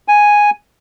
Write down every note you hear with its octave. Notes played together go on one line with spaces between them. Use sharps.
G#5